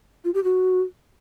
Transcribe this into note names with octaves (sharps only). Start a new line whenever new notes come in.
F4
G4
F#4